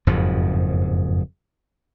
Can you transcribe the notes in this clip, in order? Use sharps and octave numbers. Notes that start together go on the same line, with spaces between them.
F#1 F2 G#2 F3